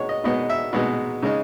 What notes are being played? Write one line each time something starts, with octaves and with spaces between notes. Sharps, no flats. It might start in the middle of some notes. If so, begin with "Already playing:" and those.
Already playing: B2 G#3 B3 D#4 C#5
D#5
B2 G#3 B3 D#4 D#5
E5
B2 G#3 B3 D#4
C#3 G#3 D#4